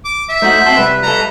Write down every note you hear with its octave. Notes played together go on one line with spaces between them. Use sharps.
D6
E5
A3 D#4 F#4 C5
C4 F#4 A5 C6
C2 G3 B4
G3 A4 A#5